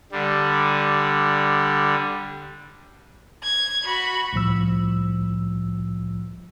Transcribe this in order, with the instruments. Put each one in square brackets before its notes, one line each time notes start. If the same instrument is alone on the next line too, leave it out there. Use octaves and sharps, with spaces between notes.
[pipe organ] D3 G3
[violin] G#6
F#4 B5
[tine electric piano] C2 A2 F3 E6